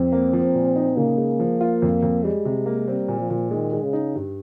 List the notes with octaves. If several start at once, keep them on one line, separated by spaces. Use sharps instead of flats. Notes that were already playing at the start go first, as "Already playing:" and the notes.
Already playing: F2 C4
A#3
F3
A#2
D#4
C#3 A#3
G#3
F3
F4
F2
F2
G3 G#3
C3
A#3
G3 C4
A#2
F3
A#2
D#3 G#3
G#3
C#3
D#4
G2